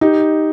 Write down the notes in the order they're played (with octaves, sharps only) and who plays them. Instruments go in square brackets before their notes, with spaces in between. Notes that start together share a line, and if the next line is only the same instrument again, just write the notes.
[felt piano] D#4 G4